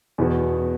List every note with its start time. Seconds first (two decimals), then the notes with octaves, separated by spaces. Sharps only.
0.18 E2 B2 B3 F#4